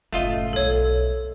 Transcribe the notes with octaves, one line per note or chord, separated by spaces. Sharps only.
F#1 A2 A3 F4 D#5
B1 A4 C#5